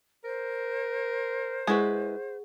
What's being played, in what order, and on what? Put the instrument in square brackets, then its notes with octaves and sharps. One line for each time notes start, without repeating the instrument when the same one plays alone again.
[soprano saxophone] A#4 [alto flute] C5
[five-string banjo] G#3 E4 B4 [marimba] G#4 F#5 C#6